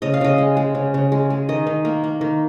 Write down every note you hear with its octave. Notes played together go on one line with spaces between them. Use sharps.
C#3 D#5
F5
C#3 D#5
G#3
G#3
C#3
C#3
G#3
G#3
D#3 D#5
D#3
A#3
A#3
D#3